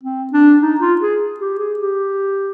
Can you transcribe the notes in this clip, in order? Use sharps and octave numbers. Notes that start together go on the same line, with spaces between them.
C4
D4
D#4
F4
G#4
G4
G#4
G4